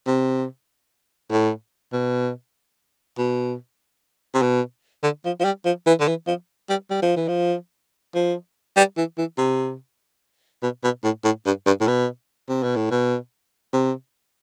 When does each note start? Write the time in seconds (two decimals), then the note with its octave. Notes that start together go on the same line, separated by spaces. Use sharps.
0.07 C3
1.31 A2
1.93 B2
3.18 B2
4.34 C3
4.42 B2
5.03 D3
5.25 F3
5.40 F3
5.45 G3
5.65 F3
5.87 E3
6.00 D3
6.08 E3
6.27 F3
6.69 G3
6.91 G3
7.02 F3
7.16 E3
7.28 F3
8.15 F3
8.77 G3
8.97 E3
9.18 E3
9.38 C3
10.63 B2
10.84 B2
11.04 A2
11.24 A2
11.46 G2
11.66 G2
11.81 A2
11.87 B2
12.49 C3
12.63 B2
12.76 A2
12.91 B2
13.73 C3